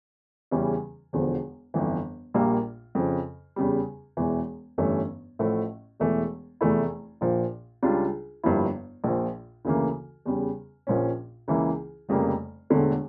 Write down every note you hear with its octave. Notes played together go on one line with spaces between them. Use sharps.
E2 C#3 E3 G3 C#4
E1 E2 D3 F3
G1 F2 E3
A#1 A#2 G3 A#3
F2 C#3 F3
E2 C#3 G3
E1 E2 E3
G1 G2 E3 A3 C#4
A1 A2 F3 A3
E1 E2 E3 A3
F1 E2 E3 A3 E4
A#1 A#2 F3
C#2 C#3 G3 D4 F4
G1 G2 F3 A#3 E4
A#1 A#2 F3
D2 C#3 E3 A#3
E2 C#3 G3
A#1 A#2 F3 C#4
C#2 C#3 E3 A#3 E4
F1 F2 C#3 G3 A#3
E1 E2 D3 A3